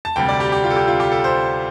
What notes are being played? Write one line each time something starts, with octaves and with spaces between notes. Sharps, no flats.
A5
D2 C3 G3 G5
D5
G4
G4
F4
A4
G4
F4
G4
A4
C5